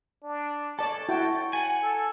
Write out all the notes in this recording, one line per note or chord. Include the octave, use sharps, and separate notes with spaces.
D4
A4 C#5 D5 A5
E4 F#4 G5
F#5 G#5
A4